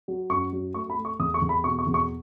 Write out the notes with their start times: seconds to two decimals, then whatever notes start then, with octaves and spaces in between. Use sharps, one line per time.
0.08 F#3
0.30 F#2 C#6
0.53 F#3
0.74 A3 C#6
0.90 B5
0.97 A3
1.05 C#6
1.19 E2 D#6
1.34 C#6
1.42 E2
1.49 B5
1.64 B2 C#6
1.79 C#6
1.86 E2
1.94 C#6